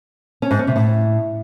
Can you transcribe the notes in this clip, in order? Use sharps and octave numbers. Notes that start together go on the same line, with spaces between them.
C#4
G#2
C#4
C3
A2